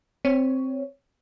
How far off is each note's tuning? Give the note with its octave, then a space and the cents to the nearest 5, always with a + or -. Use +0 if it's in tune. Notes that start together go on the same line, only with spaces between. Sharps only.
C4 +0 C#5 +10